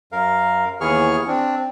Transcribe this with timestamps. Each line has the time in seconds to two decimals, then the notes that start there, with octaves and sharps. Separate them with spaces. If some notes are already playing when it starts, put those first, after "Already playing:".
0.12 F#2 A#4 F5
0.81 D#2 E3 B3 G#4 C#6 F6
1.27 C4 D4